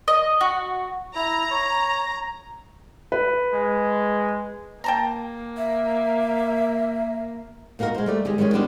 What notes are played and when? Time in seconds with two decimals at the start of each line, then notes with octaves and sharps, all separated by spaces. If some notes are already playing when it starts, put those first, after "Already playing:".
0.08 D#5
0.41 F#4
1.15 E4 A#5
1.51 C#5
3.12 B4
3.54 G#3
4.84 A#3 G5 A5 A#5
5.57 E5
7.79 A#2 A#3 D#4 F#4 A#4
7.95 G#3 C5
8.06 G3 A3 D5
8.25 D#3 G#3 G4 G#4
8.38 D#3 G3 G#3 C#4 C#5
8.53 D#3 G3 B3 D4 G4 C5